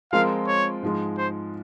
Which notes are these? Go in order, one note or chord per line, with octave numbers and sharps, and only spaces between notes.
F3 G#3 C4 F4 A#4 F5
C#5
G#2 F3 G#3
C5